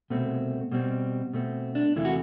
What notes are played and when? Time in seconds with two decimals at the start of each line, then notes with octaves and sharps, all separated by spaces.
0.10 C2 B2 A3 C4
0.72 B2 G3 C4
1.33 B2 A3 C4
1.75 D4
1.96 E2 C3 E3 A3 E4
2.05 F#4